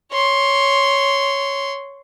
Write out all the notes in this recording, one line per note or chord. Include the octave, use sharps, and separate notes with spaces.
C#5 C6